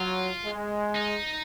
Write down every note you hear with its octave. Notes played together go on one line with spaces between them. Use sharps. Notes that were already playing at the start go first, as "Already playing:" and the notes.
Already playing: F#3 F4
G#3
D#4